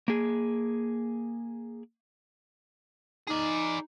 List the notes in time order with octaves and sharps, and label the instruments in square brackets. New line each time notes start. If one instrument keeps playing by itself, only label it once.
[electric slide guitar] A#3 G#4
[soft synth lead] D#4 [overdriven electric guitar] G#4 D5